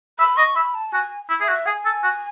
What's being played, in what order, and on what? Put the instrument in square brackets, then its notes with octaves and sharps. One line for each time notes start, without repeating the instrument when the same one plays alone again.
[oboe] E5 [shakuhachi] B5
[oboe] D#5 [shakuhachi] C#6
[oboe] E5 [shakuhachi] B5
[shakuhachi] A5
[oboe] F#4 [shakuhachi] G#5
[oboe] E4
[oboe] G#4 [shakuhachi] E5
[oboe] F#4
[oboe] G#4 [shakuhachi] G#5
[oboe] A4
F#4